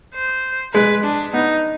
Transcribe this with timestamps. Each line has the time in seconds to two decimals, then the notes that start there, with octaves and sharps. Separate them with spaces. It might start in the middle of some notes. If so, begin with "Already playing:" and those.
0.15 C5
0.74 G#3 B4
1.04 D4
1.33 B3 D#4